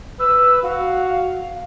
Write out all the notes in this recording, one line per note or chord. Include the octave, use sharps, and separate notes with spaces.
B4 E6
F#4 F5